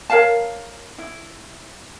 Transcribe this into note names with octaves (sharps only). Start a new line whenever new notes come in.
A#4 C#5 F5 A5
E4